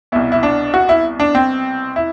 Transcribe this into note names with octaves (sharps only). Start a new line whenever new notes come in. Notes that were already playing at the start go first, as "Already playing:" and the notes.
C2 B2 E4
E4
D4
F#4
E4
D4
C4
E4